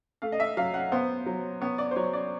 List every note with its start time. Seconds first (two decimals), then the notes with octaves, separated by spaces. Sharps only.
0.22 A3 F5
0.32 D#5
0.40 E5
0.57 F#3 F5
0.74 F#5
0.92 B3 C5
1.26 F#3
1.61 B3 C#5
1.78 D5
1.91 C5
1.96 F#3 C#5
2.13 D5